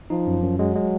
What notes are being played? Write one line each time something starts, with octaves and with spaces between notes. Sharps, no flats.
F3 D#4
F#2
F#2
F#3 G#3
G#3